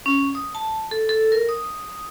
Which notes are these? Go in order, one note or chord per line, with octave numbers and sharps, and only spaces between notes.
C#4
D#6
A5
A4
A4
A#4
D#6